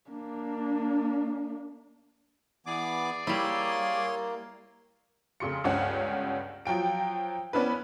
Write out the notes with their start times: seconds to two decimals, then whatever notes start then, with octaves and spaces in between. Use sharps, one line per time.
0.10 A#3 D4
2.66 E3 B3 G#4 D5 D6
3.27 G3 A#3 E4 C#5 C6
5.40 F1 C#3 C6 C#7
5.64 G1 C#2 G2 C#4 F#5
6.65 F3 F#3 G5 D7
7.53 B3 C#4 D4 E4 B4